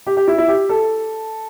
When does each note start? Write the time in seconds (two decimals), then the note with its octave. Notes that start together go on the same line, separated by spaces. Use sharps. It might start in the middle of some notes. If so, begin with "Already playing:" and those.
0.07 G4
0.17 G4
0.27 E4
0.38 E4
0.48 G4
0.69 A4